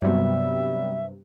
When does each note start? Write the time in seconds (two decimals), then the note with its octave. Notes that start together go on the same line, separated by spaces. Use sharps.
0.02 G2 C3 F#3 G3 B3 E5